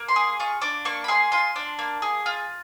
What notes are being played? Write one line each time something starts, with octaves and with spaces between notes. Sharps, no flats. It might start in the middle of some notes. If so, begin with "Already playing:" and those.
Already playing: A#3
C6
G#4
F4 C#6
D4 D6
A#3 C#6
B5
G#4 C6
F4 C6
D4
A#3
G#4
F4